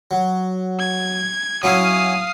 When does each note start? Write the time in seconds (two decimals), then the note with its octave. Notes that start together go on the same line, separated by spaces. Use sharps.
0.11 F#3
0.79 G#6
1.63 F#3 C#4 E4 F5 D#6